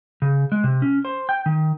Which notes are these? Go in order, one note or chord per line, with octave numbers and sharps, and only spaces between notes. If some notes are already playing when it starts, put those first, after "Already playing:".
C#3
G#3
C3
C#4
C5
G5
D#3